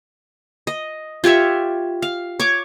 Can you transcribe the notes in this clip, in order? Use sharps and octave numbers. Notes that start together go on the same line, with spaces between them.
D#5
F4 G4 C#5 E5
F5
C#5 C#6 D6